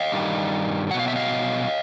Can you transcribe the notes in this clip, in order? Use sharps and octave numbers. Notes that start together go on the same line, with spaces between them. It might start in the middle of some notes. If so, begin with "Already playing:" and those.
Already playing: D#5 F5
G2 D#3 G3
B2 F#3 F#5
F5
E5
D#5 F5